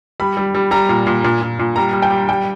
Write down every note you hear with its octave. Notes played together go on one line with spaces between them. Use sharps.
G3 B5
G3
G3
G3 A#5
A#2
A#2
A#2
A#2
A#2
G3 A#5
G3
G5
G3
G3 G5